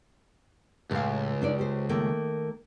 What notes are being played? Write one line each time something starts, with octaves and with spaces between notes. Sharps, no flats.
C#2 A2 G4 F5
D4 D#4 D5
G4 C5
D#3 A3 A#3